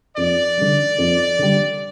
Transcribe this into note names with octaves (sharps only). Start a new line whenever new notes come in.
F2 D5
D3 G3
F2
D3 G3